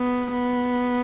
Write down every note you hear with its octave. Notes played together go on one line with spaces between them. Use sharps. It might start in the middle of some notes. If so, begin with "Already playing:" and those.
Already playing: B3
B3